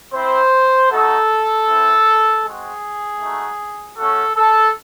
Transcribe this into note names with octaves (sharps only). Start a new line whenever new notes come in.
C4 E4 C5
A3 D#4 F#4 A4
C4 E4
G#3 C4 F#4 G#4
A3 D#4 F#4
A3 C#4 F#4 A4
A4